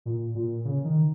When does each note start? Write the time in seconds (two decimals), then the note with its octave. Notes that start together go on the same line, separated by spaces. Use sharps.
0.05 A#2
0.35 A#2
0.65 C#3
0.84 D#3